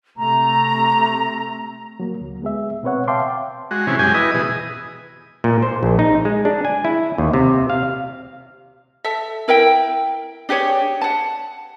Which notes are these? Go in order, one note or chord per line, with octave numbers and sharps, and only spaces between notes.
C3 A3 A#5
F#3 A#3
D2
G#3 B3 G#4 E5
B2 C4 B4 C#5 F#5
E5 F5 G5 A5 C6 D6
G#3 F#4
C3 E3 C#4 G#4
F#2 G#3 G4 G#5
E4 B4 D#5 D#6
B2 E3 G#4
A#2
C5
A#1
D#4
G#3
D4
G#5
E4
D#2
C3
F5
A4 E5
E4 A#4 E5 G5
D4 G4 G#4 C#5
F#5 A5